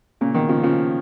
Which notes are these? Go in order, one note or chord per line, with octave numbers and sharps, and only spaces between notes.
A#2 C#3
B2 D#3
C#3 F3
C#3 F3